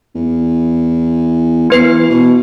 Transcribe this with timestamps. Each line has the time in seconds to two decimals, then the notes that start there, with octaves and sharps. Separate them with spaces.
0.15 E2
1.70 E3 B3 B4 C7
2.10 B2